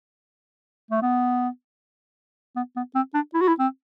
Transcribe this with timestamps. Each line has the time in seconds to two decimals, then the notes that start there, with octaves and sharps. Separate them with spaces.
0.91 A3
1.02 B3
2.56 B3
2.76 B3
2.95 C4
3.14 D4
3.34 E4
3.41 F#4
3.48 E4
3.59 C4